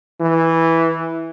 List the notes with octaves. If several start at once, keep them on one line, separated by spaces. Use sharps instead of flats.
E3